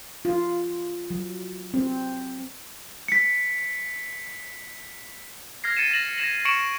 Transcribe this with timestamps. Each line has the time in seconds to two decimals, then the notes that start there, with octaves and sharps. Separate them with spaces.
0.25 F4
1.10 F#3
1.74 C4
3.08 B6 C#7
5.64 F6 G#6 A#6 C7
5.77 A6 C#7 D#7 E7
5.90 A6 A#6 E7 F#7
6.18 G#6 A#6 E7 F#7
6.45 C#6 C#7 D7 E7 F#7